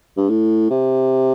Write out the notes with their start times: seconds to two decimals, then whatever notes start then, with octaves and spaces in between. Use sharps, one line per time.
0.17 G2
0.29 A2
0.70 C3